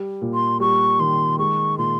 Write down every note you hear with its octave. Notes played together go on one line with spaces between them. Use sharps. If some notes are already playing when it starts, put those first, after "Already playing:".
Already playing: G3
A#2
C6
G3 C#6
D#3 C6
G#3 C#6
A#2 C6